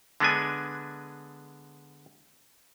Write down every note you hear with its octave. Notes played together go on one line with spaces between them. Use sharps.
D3 G#3 B3 D4 G#5